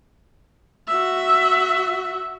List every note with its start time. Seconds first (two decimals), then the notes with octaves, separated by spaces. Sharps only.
0.88 F#4 E5